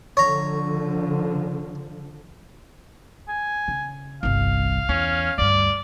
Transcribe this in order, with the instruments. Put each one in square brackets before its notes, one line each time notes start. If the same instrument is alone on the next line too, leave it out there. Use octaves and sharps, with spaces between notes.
[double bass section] D3 F3 [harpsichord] C#5 A#5
[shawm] G#5
[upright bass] C#3
[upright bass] G1 C2 [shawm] F5
[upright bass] E2 [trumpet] C#4
[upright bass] D2 G2 [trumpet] D5